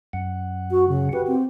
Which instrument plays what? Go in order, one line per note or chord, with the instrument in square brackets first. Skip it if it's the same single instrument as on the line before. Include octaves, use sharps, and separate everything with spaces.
[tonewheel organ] F#2 F#5
[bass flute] F#4
C#3
[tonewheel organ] F#4 G4 [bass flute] B4
[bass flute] C4